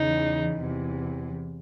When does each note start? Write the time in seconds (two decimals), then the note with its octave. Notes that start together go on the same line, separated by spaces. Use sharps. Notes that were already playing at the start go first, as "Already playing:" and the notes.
Already playing: E2 C#3 E3 D#4
0.60 E2 C3 E3